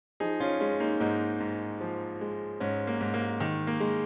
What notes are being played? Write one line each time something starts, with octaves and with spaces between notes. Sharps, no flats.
F3 D#4 G#4
C#4 F4
G#3 C#4
A#3 D#4
G#2 A#3 D#4
G#2
F3
G#3
G#2 C#4
A#3
G#2
A#3
D#3
A#3
G#3